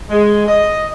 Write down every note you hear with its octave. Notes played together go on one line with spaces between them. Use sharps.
G#3
D#5